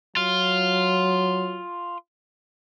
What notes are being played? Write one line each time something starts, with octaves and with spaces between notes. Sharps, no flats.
F#3 F4